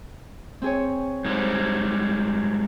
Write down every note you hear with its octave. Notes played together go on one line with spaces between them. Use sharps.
C4 G#4 C#5
G#2 F#3 G3 C5 D#6